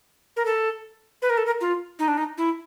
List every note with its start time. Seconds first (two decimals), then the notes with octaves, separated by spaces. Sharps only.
0.37 A#4
0.46 A4
1.22 B4
1.30 A#4
1.37 A4
1.46 A#4
1.61 F4
1.99 D#4
2.08 D4
2.18 D#4
2.38 E4